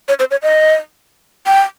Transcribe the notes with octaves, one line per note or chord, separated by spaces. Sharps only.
C#5
C5
C#5
D#5
G5